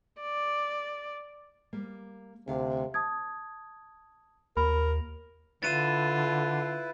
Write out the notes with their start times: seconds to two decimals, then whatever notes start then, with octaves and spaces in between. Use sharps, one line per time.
0.21 D5
1.73 G3 A#3
2.48 D2 C3 D4 F5
2.94 A5 D#6 G#6
4.57 D#2 A#4 B5
5.63 D3 E4 F4 B4 A6 D#7 E7